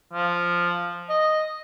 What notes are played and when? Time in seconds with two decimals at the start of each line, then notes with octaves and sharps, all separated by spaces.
0.13 F3
1.10 D#5